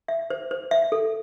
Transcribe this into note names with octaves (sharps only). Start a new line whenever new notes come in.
E5
C5
C5
E5
A4